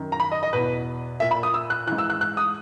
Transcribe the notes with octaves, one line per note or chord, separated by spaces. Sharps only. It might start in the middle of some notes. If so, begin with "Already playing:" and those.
Already playing: F#2 D#3
A#5
B5
D#5
D#5
E2 B2 B4
A#2 E5
B5
D#6
E6
F#6
G#2 E3 F#6
E6
F#6
F#6
D#6